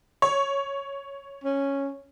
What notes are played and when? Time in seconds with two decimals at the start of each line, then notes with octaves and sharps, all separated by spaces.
0.22 C#5
1.44 C#4